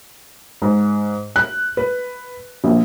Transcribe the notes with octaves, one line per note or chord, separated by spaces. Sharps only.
G#2
F#6
B4
A#1